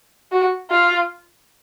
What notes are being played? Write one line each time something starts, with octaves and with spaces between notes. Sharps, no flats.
F#4
F4